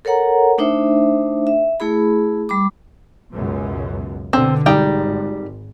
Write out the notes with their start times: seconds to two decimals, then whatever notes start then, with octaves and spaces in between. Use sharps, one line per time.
0.05 A4 A#4 C#5 F#5 A#5
0.58 A3 D4 D#4 C5 E5
1.47 E5
1.80 A3 E4 G#4 B5
2.49 G3 B5 D6
3.33 C#2 F#2 B2
4.33 B2 D3 C4
4.66 G#1 G3 D#4 G5